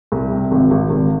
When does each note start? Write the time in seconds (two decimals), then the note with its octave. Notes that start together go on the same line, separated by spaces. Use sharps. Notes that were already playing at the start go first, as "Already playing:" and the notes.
0.12 C2
0.31 C3
0.51 G#1
0.71 G#1
0.90 G#1